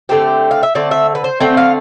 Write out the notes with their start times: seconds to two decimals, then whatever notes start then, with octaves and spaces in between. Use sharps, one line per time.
0.09 D3 A3 C4 G4
0.51 F5
0.63 E5
0.75 D3 A3 C4 D5
0.91 E5
1.15 B4
1.24 C5
1.40 D3 A3 C4 G5
1.57 F5